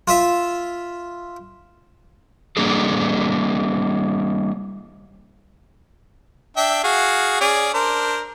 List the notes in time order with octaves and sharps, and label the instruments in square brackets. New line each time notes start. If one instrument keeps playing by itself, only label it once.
[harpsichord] F4 E5
[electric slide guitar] G3 A#3 D4 G#4 A4
[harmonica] D4 E5 G5
F#4 G#4 F5
C#4 G#4 D5
D4 A#4 C5